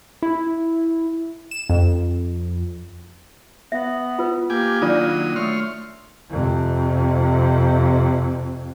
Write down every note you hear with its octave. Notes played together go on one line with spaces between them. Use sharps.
E4
E7
F2
B3 E5
F4 B4
A#3 G4 G#5 D6
D#3 F#3 D4 F4 D5 D#6
A3 C#5 C6 F6
F2 C3